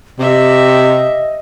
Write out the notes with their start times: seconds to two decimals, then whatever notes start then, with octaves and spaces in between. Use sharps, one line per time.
0.19 C3 G4 D#5 E5